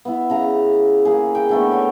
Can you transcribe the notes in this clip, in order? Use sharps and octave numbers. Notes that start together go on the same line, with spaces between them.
B3 E4
C#3 A#5
A#3 G#4
G5
D3 A3 B3
C#5